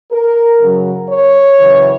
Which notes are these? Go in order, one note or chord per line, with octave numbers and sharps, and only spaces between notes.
A#4
F#2 C#3 F#3
C#5
F#2 C#3 E3